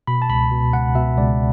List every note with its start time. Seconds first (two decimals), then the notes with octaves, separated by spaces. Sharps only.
0.07 B2 B5
0.22 A5
0.29 C#2 B5
0.51 B2
0.73 C#2 F#5
0.95 B2 E5
1.17 C#2 D5